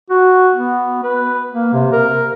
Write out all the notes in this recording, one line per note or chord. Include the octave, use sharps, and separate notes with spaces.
F#4
B3
B4
A#3
C3
A#4